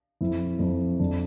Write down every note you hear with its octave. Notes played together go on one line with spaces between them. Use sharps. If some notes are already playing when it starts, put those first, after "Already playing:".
F2 E4
F2
F2 D4